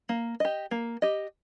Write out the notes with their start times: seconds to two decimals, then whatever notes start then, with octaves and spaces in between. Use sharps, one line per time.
0.09 A#3
0.40 G4 D#5
0.71 A#3
1.02 G4 D#5